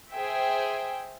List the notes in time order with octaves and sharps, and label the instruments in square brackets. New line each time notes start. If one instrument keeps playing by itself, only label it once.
[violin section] G#4 C5 E5 G5